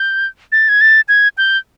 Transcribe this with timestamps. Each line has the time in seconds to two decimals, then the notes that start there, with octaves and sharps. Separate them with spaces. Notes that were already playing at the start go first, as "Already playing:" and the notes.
Already playing: G6
0.52 A6
0.69 G#6
0.81 A6
1.08 G#6
1.38 G6